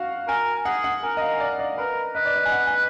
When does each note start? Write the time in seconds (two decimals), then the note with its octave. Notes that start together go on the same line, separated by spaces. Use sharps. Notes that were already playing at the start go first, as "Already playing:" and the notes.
Already playing: F#4 F5
0.28 A#4 G#5
0.65 G#4 F#5
0.84 F#5
1.03 A#4 G#5
1.17 D#5
1.22 F5
1.40 D5
1.59 D5
1.78 A#4 B4
2.15 B4 D#5
2.25 D5
2.36 D#5
2.45 G#5
2.52 F#5
2.67 G#5